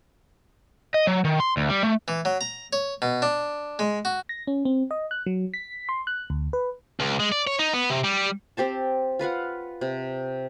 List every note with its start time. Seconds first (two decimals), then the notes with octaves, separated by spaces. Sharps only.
0.94 D#5
1.07 F#3
1.25 D#3
1.40 C6
1.57 D2
1.69 G3
1.83 A3
2.08 E3
2.25 F#3
2.41 A#5
2.73 C#5
3.02 B2
3.22 D4
3.79 G#3
4.05 F#4
4.29 A#6
4.47 C#4
4.65 C4
4.91 D#5
5.11 F#6
5.26 F#3
5.54 B6
5.89 C6
6.07 F#6
6.30 D2
6.53 B4
7.00 C#2
7.20 G#3
7.32 D5
7.47 C#5
7.59 D#4
7.73 B3
7.90 C3
8.04 G3
8.57 C4 G4 C5 A5
9.19 F4 B4 F5 F#5
9.81 C3